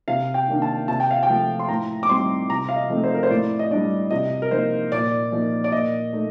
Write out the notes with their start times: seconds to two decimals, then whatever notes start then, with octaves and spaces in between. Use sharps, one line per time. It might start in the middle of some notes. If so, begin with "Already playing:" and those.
0.08 C3 F5
0.34 G5
0.48 D#3 A#3 D4
0.62 A5
0.88 C3 A5
1.00 G5
1.11 F5
1.23 G5
1.29 F3 A3
1.60 C6
1.69 A2 A#5
2.03 D6
2.09 G3 C4 D#4 C6
2.49 C3 A#5
2.69 F5
2.76 D#5
2.90 F3 A3 C4 D#4
3.04 C5
3.14 A#4
3.23 C5
3.30 A2 D5
3.59 D#5
3.71 G3 D4 D5
4.11 C3 D#5
4.42 A#4
4.51 F3 A#3 D#4 C5
4.92 A#2 D5
5.32 F3 A#3 D#4
5.64 D5
5.72 A#2 D#5
6.13 A3 D#4